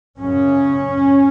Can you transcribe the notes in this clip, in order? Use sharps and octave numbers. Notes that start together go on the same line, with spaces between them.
F#2 C#3 C#4